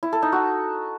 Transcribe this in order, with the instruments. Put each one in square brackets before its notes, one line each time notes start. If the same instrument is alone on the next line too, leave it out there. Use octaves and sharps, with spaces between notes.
[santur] E4
A4
D#4
F#4